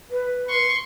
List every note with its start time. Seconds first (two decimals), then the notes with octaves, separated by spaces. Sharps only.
0.11 B4
0.49 C6 C#6